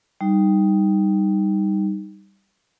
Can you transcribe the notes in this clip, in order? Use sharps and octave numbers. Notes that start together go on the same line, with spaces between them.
G3 D#4